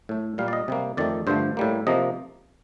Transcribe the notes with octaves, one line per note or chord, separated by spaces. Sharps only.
A2 A3
A#2 G3 A#3 F5
D5
D#5
C3 G3 A#3
F2 D#3 A3 D5
G2 D3 F3 A3 C5
A2 G3 A#3
C3 F3 A#3 D#5